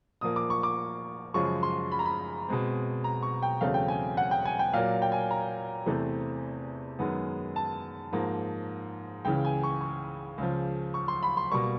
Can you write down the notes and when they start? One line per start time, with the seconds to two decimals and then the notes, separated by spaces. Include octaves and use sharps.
0.21 A#2 F3 A#3 D#6
0.36 D6
0.50 C#6
0.63 D6
1.34 F#2 C#3 F3 G#3 C#6
1.63 C6
1.92 B5
1.99 A#5
2.06 B5
2.48 B2 G#3 C4
3.04 A#5
3.22 C#6
3.43 G5
3.61 E2 C#3 F#3 A3 C4 F5
3.74 G5
3.88 G#5
4.17 F#5
4.31 G5
4.45 G#5
4.59 G5
4.73 A#2 F#3 A#3 F5
5.02 G5
5.12 G#5
5.31 A#5
5.86 E2 C3 E3 A3 C4
6.99 F#2 D#3 G#3 B3
7.56 A5
8.12 G#2 F3 A#3
9.25 C#2 C#3 E3 G5
9.45 G#5
9.63 C#6
9.81 C#6
10.38 C#2 C#3 F3
10.94 C#6
11.08 C6
11.23 B5
11.37 C6
11.51 B2 G3 A#3 C#6